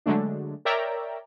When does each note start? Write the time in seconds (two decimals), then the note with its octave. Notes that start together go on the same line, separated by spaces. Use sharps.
0.06 D3 F#3 G#3 A3 D4
0.65 A#4 C#5 D5 E5 G5 A#5